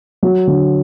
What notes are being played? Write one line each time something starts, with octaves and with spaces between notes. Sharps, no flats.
F#3
D3